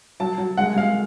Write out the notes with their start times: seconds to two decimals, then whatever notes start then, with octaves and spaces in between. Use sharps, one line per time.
0.20 F#3 A5
0.38 F#3
0.57 G#3 F#5
0.76 G#3 F5